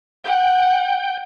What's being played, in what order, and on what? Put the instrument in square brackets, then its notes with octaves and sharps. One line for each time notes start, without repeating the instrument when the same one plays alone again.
[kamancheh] F#5 [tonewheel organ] G5